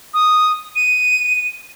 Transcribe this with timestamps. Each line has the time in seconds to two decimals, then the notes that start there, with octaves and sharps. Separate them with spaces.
0.14 D#6
0.76 D#7